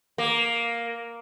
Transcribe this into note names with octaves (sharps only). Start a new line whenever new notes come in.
A#3